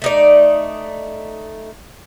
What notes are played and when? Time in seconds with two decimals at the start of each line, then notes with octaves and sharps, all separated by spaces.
0.02 A3 D#4 D5